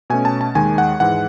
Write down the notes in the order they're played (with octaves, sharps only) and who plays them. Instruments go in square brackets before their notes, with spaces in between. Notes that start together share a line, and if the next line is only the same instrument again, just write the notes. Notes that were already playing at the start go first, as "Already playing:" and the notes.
[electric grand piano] B2 A3 C#4 G#5
A5
A5
D#2 D#3 G#3 G#5
F#5
G#2 E3 G#3 F#5